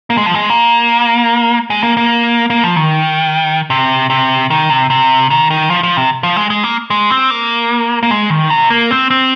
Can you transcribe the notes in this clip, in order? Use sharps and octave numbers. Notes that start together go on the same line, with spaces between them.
A#3
G#3
F3
G#3
A#3
G#3
A#3
A#3
A#3
F3
D#3
C3
C3
D#3
C3
C3
D#3
D#3
F3
F3
C3
F3
G#3
G#3
A#3
G#3
C4
A#3
A#3
G#3
D#3
C3
A#3
C4
C4